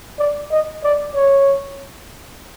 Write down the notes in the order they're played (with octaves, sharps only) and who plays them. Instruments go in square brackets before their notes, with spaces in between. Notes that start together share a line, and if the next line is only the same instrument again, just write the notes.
[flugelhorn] D5
D#5
D5
C#5